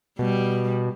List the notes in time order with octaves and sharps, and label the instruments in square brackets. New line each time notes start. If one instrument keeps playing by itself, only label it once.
[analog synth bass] B2 [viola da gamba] G3